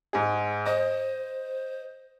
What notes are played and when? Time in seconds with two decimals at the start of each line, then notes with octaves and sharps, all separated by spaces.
0.13 G#2 G#4
0.66 C5 D#5